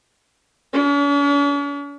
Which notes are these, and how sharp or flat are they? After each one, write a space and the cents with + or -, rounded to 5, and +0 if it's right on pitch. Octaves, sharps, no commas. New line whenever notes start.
C#4 +45